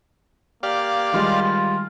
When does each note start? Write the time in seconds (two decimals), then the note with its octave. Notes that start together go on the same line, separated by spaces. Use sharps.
0.63 A#3 G4 D5 F5
1.13 D#3 G3 G#3 F4